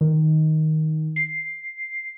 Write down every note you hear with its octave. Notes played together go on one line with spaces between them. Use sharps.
D#3
C7